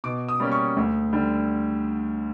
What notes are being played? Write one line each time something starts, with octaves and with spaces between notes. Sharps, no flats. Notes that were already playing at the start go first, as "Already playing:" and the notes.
B2 D6
D#6
G3 A#3 C#4
C#6
D2
D3 G3